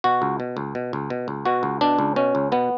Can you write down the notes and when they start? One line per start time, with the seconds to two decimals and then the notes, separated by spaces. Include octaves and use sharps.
0.04 B2 F#4
0.22 C#2
0.40 B2
0.57 C#2
0.75 B2
0.93 C#2
1.10 B2
1.28 C#2
1.45 B2 F#4
1.63 C#2
1.81 B2 D4
1.99 C#2
2.16 B2 C#4
2.35 C#2
2.52 B2 B3